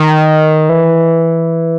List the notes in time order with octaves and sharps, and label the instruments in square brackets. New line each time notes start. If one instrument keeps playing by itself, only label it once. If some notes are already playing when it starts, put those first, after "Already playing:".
Already playing: [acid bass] D#3
E3